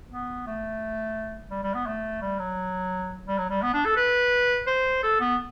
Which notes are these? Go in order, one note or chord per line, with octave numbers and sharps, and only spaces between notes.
B3
A3
G3
G3
B3
A3
G3
F#3
G3
F#3
G3
B3
D4
A4
B4
C5
A4
B3